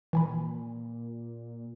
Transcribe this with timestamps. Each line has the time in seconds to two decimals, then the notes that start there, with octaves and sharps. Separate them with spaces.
0.13 A#2 E3 G#5 B5